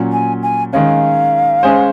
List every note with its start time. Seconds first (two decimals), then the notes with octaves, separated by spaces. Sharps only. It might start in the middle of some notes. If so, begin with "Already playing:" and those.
Already playing: A#2 F#3 C#4
0.12 G#5
0.43 G#5
0.73 D#3 G#3 C#4 F5
1.63 G#3 C#4 G#4 C5